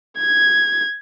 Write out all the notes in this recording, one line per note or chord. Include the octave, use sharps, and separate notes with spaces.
G#6